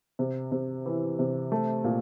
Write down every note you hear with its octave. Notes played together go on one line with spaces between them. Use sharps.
C3
C3
E3
C3
A3
A#2